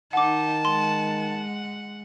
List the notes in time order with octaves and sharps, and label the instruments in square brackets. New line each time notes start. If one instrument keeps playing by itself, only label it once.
[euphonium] D#3 [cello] D#4 [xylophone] F#5 D6 [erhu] A5
[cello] G#3 F#5 [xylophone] C6